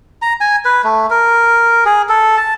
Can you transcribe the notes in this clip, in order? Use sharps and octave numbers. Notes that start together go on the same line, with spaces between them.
A#5
G#5
B4
A3
A#4
G#4
A4
A5